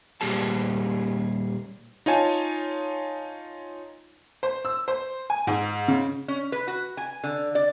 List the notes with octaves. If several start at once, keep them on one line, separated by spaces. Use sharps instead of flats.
A#2 G3 A#3 G4 G#4 A5
D#4 F4 C#5 G#5 A5
C5
E6
C5
G#5
G#2
C#3
C#4
B4
F#4
G#5
D3
D5